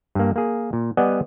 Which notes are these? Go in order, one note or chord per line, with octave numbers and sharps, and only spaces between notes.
G2 A#3
A#3 G#4
A#2
G3 B3 D5 D#5 F#5 G#5